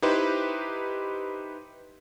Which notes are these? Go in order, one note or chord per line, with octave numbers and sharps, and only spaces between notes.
D#4 E4 G4 B4 C5